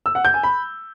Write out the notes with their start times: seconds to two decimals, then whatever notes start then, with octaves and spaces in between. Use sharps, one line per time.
0.06 E6
0.15 F#5
0.25 G6
0.34 G#5
0.44 B5